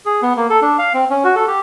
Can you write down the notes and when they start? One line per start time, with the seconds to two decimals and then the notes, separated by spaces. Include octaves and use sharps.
0.06 G#4
0.22 B3
0.36 A#3
0.50 A4
0.62 D4
0.79 F5
0.94 C4
1.10 C#4
1.24 F#4
1.36 A4
1.48 G4